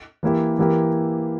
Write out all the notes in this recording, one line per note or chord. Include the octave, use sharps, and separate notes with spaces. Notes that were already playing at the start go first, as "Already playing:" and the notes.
E3 A#3 E4 G4
E3 A#3 E4 G4 A#4